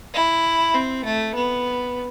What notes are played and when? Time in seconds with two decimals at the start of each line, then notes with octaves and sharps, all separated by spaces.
0.14 E4
0.74 C4
1.05 A3
1.35 B3